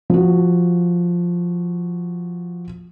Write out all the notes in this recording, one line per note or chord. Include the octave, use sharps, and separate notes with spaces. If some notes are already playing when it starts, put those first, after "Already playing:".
F3 F#4